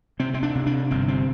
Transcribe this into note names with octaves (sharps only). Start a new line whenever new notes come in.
C3 C4
C4
D4
C3
D4
G1 C4
C4